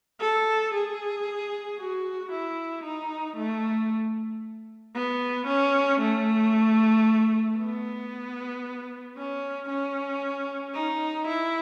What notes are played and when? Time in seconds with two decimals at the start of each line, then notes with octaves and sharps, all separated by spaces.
0.20 A4
0.74 G#4
1.79 F#4
2.32 E4
2.84 D#4
3.37 A3
4.95 B3
5.47 C#4
6.00 A3
7.59 B3
9.17 C#4
9.69 C#4
10.74 D#4
11.27 E4